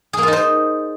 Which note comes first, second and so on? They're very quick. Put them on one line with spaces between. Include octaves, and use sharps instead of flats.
G#4 A#3 F4 D#4 C5